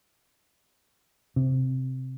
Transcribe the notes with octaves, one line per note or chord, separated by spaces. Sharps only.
C3